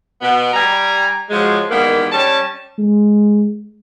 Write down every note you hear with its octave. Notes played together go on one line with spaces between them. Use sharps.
B2 B3
G3 G#5 A#5
F3 F#3 G#3
D#3 E3 G3 G#3 A#3 B3
G3 C#4 A5
G#3